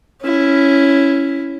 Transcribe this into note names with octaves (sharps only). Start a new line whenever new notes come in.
C#4 E4